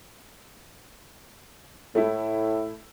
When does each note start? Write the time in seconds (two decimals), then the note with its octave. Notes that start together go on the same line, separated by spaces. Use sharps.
1.95 A2 A3 E4